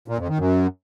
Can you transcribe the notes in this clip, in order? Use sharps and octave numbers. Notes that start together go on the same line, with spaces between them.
A#2
F2
D#3
F#2